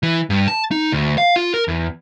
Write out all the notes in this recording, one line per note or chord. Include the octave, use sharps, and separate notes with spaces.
E3
G2
A5
D#4
D2
F5
F4
A#4
E2